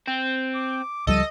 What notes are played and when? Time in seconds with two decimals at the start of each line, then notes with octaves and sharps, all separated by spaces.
0.08 C4
0.55 D6
1.07 C#2 F3 G3 A4 D#5